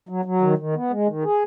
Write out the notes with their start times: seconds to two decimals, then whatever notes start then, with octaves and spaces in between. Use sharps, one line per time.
0.09 F#3
0.25 F#3
0.42 D#3
0.58 D#3
0.75 B3
0.91 G#3
1.07 D#3
1.24 G#4